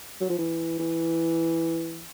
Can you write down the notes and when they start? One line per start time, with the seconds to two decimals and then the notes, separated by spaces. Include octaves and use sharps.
0.21 F#3
0.30 F3
0.38 E3
0.79 E3